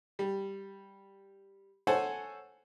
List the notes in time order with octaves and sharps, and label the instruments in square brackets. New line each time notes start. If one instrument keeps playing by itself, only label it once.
[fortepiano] G3
A4 C5 C#5 F#5 G#5